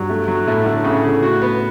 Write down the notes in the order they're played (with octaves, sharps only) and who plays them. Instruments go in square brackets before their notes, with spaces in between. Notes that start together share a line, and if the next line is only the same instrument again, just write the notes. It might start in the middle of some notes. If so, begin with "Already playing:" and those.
Already playing: [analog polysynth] G2 [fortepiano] F#3
[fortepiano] A3
F#3
[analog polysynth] A2 [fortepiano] A3
[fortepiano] D3
[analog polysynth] A2 [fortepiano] C#3
[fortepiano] C#3
F#4
B3